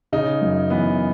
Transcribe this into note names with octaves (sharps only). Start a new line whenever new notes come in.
C#3 D#4
F#2
E3 B3